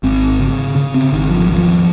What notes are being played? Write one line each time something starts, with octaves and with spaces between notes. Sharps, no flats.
G#1 C4
C#3
C#3
C4
G#1 D#3
F3
D#2 F3